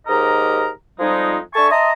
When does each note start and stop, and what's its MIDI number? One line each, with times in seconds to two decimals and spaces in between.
0.07 0.68 39
0.07 0.68 44
0.07 0.68 67
0.07 0.68 70
0.07 0.68 75
0.07 0.68 82
0.99 1.37 41
0.99 1.37 53
0.99 1.37 55
0.99 1.37 56
0.99 1.37 63
1.54 1.69 62
1.54 1.69 69
1.54 1.69 76
1.54 1.69 80
1.54 1.69 81
1.54 1.69 85
1.70 1.92 75
1.70 1.92 76
1.70 1.92 81
1.70 1.92 82
1.70 1.92 84
1.70 1.92 87